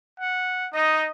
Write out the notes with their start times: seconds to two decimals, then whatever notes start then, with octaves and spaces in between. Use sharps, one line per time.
0.20 F#5
0.74 D#4 D#5